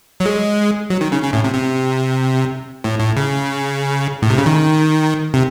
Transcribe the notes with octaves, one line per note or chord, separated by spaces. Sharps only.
F#3
G#3
F#3
D#3
C#3
C#3
A2
C3
C3
A2
A2
C#3
A2
C3
C#3
D#3
C3